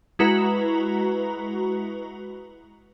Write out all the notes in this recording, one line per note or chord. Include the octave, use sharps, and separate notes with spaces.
G#3 E4 F#4 B4 A#5